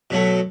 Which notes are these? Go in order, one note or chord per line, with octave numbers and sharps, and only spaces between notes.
B2 F#3 A3